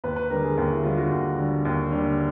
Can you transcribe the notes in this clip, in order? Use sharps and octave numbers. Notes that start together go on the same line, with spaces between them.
D#2 B4
B4
D3 G3 A#4
G#4
D#2
E4
D3 G3 F4
F#4
D#2
D3 G3
D#2
D3 G3